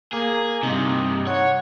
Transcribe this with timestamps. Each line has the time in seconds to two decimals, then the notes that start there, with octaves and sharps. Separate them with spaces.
0.13 A#3 G#4
0.63 G2 C3 D#4
1.27 C#5 F#5